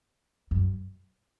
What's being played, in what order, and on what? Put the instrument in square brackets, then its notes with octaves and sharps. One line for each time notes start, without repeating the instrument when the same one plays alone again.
[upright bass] F#2